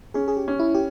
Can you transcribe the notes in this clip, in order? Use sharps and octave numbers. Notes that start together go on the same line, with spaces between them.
C#4 G#4
G#4
G4
C#4
E4
G4